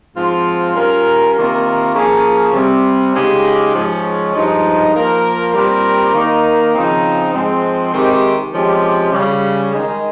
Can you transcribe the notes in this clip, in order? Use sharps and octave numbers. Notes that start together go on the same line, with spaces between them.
G#2 F3 C4 F4
G3 C#4 F4 A#4
C3 D#3 A#3 F4 A#4
F3 A#3 C#4 G#4
C3 G3 C4
C#3 G#3 D#4 G4
G#2 F3 G#3 C#4
G2 F3 G#3 D#4
F3 A#3 F4 A#4
A#2 G3 C4 G4 A#4
D#3 A#3 D#4
C#3 F3 C4 D#4
G#2 F3 G#3 C4
C3 D#3 G#3 C4 G4
C3 F3 G#3 C#4 G4
C#3 G3 C#4
D#3 G#3 D#4 G#4